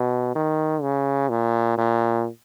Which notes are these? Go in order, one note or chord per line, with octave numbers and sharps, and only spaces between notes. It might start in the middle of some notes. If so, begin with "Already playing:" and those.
Already playing: B2
D#3
C#3
A#2
A#2